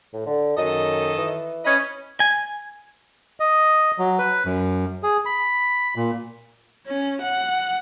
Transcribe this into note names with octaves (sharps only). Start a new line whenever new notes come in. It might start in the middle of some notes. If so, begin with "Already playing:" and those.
A2
D3
F#2 D#3 A4 D#5
E3
C#4 B4 D#5
G#5
D#5
F#3
B4
F#2
G#4
B5
A#2
C#4
F#5